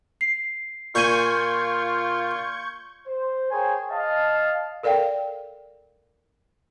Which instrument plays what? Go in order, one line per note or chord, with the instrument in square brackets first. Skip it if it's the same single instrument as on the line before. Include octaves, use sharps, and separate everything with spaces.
[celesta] C7
[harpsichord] A#2 G#5 [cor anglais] F4 [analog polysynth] C#6 G6 G#6
[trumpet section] C5
G#4 A#4 C5 C#5 G5 G#5
D#5 F5 A5
[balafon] A4 A#4 D5 F5 G5